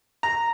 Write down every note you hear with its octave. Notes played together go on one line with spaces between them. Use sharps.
A#5